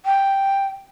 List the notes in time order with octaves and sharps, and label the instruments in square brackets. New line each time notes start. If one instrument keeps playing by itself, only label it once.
[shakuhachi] G5